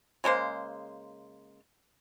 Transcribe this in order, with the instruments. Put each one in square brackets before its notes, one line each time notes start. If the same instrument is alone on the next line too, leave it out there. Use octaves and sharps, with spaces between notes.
[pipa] C#3 G#3 A#3 C5